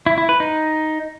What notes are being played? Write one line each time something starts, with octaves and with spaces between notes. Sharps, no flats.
E4
E4
B4
D#4